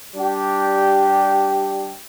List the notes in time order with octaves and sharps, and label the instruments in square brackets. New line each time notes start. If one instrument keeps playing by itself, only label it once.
[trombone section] G3 D4 G4